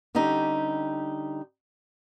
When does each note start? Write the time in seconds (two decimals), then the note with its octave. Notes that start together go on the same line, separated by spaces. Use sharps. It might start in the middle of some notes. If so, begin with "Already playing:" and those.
0.15 D3 G3 C#4 D#4 G4